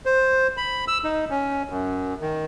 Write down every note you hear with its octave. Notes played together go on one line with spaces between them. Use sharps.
C5
B5
E6
D#4
C#4
F#2
D#3